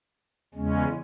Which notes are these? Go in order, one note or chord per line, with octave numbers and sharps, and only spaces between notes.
E2 C#3 G#3 C#4